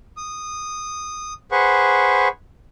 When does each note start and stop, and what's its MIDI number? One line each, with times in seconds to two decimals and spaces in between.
0.17 1.33 87
1.52 2.28 68
1.52 2.28 71
1.52 2.28 72
1.52 2.28 78
1.52 2.28 85